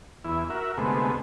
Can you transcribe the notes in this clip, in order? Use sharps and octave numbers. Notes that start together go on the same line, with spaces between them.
E2 E4
F#4 A#4 E5
D2 C3 G#3 A3 B3